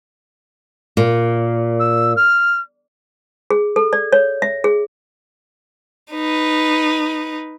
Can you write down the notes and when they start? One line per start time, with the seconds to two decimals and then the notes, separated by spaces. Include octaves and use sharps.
0.97 A#2
1.79 E6
2.16 F6
3.50 G#4
3.76 A4
3.93 D5
4.12 C#5
4.42 E5
4.64 G#4
6.13 D#4 B4